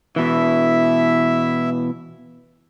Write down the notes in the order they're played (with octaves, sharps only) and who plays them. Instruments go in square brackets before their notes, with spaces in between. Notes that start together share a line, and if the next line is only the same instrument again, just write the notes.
[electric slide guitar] B2 E3 [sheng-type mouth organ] E4 E5